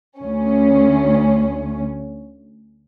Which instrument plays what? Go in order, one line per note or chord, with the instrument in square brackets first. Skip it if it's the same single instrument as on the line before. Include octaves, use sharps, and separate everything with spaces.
[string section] D2 C#4